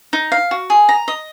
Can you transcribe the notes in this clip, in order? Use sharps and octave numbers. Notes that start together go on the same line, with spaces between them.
D#4
F5
F#4
G#4
A#5
D#5